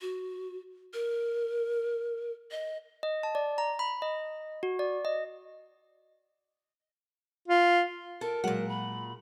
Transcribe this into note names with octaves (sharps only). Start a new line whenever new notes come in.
F#4
A#4
D#5
D#5
A5
D5
A#5
B5
D#5
F#4
D5
D#5
F4
A4 A#4
A#2 F#3 G#3 F#5
B5